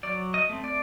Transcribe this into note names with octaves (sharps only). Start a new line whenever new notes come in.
F#3 D5
D#5
A3 C4
D5